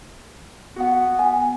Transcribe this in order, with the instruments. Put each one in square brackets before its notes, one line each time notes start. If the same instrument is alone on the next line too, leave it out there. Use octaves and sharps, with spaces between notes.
[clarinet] B3 [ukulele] F#4 F#5
[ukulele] G#5